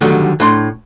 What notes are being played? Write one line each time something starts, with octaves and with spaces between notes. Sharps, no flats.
D3 D#3 F#3 G3 A3
A2 D4 C6